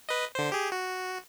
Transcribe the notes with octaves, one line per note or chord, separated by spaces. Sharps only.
B4 D#5
D3 C5
G4 G#4
F#4